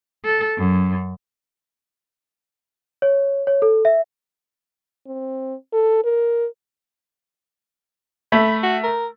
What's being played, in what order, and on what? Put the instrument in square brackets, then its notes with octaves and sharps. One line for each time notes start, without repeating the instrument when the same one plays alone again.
[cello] A4
F#2
[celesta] C#5
C#5
A4
E5
[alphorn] C4
A4
A#4
[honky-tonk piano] A3 [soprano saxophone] B5
[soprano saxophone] F#4
A#4